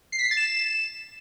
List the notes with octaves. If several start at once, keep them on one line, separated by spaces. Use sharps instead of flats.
C7
B6
C7
A6
E7